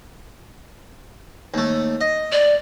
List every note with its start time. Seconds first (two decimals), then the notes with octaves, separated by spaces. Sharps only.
1.54 D#2 A3
2.01 D#5
2.32 D5